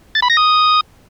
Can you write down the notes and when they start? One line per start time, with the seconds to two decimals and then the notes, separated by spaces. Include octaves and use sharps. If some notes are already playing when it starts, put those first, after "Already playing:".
0.15 A6
0.22 B5
0.30 A#6
0.37 D#6